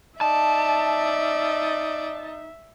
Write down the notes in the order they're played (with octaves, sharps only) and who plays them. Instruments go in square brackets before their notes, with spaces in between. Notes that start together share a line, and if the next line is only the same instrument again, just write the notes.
[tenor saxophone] D#4 [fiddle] D5 [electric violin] E5 [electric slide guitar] A5